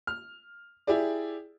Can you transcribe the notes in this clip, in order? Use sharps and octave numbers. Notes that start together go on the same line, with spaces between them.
F6
E4 G4 G#4 D5